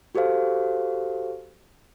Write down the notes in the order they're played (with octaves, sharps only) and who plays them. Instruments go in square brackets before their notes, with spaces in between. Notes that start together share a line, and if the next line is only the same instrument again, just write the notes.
[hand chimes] F#4 G4 A4 C5 F5